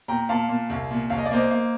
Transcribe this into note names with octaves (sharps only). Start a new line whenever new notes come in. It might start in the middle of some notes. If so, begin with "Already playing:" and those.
A#2 G5 A#5
A#2 F5 A5
A#2
C2
A#2
C2 F5
D#5
D5
A#3 C5 D#5
A#3